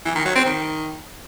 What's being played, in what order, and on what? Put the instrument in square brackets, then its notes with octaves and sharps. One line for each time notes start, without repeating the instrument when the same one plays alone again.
[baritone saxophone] E3
D#3
F#3
C4
D#3